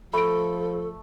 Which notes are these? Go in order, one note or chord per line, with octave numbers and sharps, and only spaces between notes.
F3 A3 A4 B5 D7